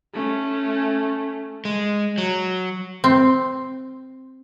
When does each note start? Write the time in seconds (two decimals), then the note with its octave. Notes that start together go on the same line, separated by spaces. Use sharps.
0.14 A3 C#4
1.65 G#3
2.18 F#3
3.04 C4